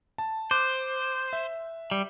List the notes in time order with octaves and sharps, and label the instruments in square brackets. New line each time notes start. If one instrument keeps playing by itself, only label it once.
[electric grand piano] A5
[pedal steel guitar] C5 [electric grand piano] D6 F#6
[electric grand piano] E5
[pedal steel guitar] G3